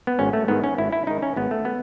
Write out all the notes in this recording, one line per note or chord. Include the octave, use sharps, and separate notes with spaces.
B3
G#1 C#4
A3
G#2 D#3 B3
C#4
G#1 E4
E4
G#2 D#3 D#4
C#4
G#1 B3
A3
B3